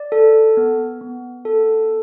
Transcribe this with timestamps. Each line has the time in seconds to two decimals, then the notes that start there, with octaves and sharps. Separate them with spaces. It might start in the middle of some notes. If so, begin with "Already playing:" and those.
Already playing: D5
0.12 A4
0.57 B3
1.01 B3
1.45 A4